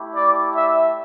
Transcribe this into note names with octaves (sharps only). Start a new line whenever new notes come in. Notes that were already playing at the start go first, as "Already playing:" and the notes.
Already playing: A3 E4 G4
D5
E5